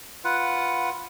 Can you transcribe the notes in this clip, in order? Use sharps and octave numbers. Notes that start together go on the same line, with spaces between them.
F4 B4 F#5